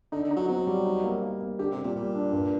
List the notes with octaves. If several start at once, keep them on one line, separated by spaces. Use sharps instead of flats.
D3 D#4
D3
D#4
F#3
F#3 C4
G3
D#4
A#3
A#3
A#3
D3 G4
C3
G3
A#2
A#2 G3
D4
G2